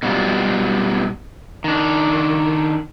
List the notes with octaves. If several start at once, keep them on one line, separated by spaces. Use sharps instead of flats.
B2 F#3 G3 F4
D#3 D4